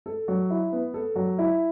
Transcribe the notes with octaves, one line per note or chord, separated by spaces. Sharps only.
A4
F#3
E4
B3
A4
F#3
E4